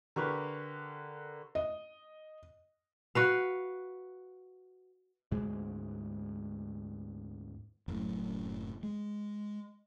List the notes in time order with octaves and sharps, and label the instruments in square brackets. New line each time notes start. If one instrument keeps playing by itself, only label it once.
[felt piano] D3 G4 B4 [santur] A#4 C#6
[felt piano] D#5
[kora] F#4 B4 F5
[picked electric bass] D2 G#2 G#3
[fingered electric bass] F#1 F#2 A2
G#3